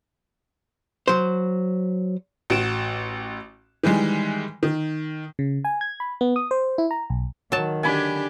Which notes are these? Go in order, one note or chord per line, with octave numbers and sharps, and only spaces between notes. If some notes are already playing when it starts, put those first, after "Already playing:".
F#3 C5
A1 F#4 D7 E7
D#3 E3 G3 G#3
D#3
C#3
G#5
G#6
B5
B3
D#6
C5
E4
A#5
B1
D#3 F#3 A5
D3 D4 G4 G#5 B5